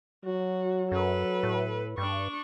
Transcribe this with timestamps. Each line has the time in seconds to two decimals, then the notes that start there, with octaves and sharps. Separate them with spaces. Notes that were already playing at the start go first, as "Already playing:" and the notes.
0.24 F#3 F#4
0.92 F#2 A4 B4
1.43 A2
1.98 G2 D4 C#6